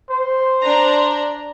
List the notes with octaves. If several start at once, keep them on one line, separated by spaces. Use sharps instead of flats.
C5
D4 A#5